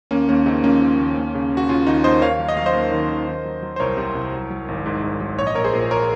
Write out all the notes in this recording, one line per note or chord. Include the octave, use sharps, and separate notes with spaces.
D#2 A#3 C#4
D#2 A#3 C#4
C#3 C4 D#4
F3 A#3 C#4
F3
D#2
D#2
C#3
D#2
F#4
C#3 C#4 F4
D#2 D#4 F#4
D#2 C5 D#5
D#3 C#5 F5
F#3
D#5
F#3 F5
C5 D#5
D#2
D#3
D#3
D#3
F#3
F#3
C5
C2 A#4 C#5
C3
C2
F#3
F#3
G#1
G#2
G#2
F#3
A#1 C#5
D#5
A#1 A#4 C#5
G#4 C5
A#2
A#4 C#5